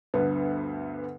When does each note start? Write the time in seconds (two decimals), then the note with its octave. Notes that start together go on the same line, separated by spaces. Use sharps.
0.14 D2 G2 B3